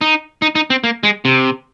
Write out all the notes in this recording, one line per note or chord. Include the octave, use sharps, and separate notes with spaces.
D#4
D#4
D#4
C4
A#3
G#3
C3